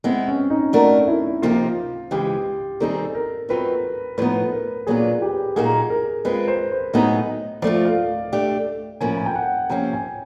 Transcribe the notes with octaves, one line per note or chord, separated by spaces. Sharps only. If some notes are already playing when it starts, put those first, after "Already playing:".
G#3 B3 C4 E4
C#4
D#4
A3 D4 F#4 A#4
E4
C3 F3 A#3 D#4 F4 G4
C#3 E3 G#3 C4 G4
D#3 G3 C4 D#4 G#4 A4
A#4
B2 F#3 A3 C4 F4 B4
A2 F3 G#3 B3 D#4 B4
A#4
A#2 F#3 B3 D4 F4 G#4
G4
A#2 F#3 A#3 D#4 F#4 G#4
A#4
G#3 C4 F4 B4
C5
C5
A2 F#3 B3 D#4 G#4 D#5
F3 A3 C4 F4 D5
F5
A3 D4 G4
A2 F3 A#3 C#4 E4 G#5
G#5
G5
F#5
C3 F3 A#3 C#4 G5
G#5